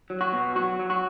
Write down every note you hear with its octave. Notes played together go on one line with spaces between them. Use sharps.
F#3
F#4
B2
F#3 F#4
F#3
F#4